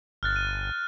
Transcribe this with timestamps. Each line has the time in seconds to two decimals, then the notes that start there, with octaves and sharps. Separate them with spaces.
0.23 G1 F6 F#6 A6
0.36 D#7